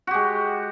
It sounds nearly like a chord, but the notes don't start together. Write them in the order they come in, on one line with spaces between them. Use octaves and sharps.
F#4 G4 G#3